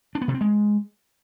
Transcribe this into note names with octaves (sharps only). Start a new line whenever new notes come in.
D4
B3
C3
C4
G#3